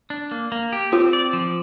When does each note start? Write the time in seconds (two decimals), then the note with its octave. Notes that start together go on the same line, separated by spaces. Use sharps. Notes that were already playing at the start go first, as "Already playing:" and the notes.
0.10 D4
0.31 A#3
0.52 A#3
0.73 G4
0.92 C4 F4
1.13 D5
1.33 F3